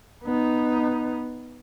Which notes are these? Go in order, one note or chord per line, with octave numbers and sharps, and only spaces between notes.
B3 D#4